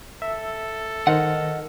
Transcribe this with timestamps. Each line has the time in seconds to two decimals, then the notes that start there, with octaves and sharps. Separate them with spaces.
0.22 A4 E5
1.07 D#3 A#4 C5 D#5 F#5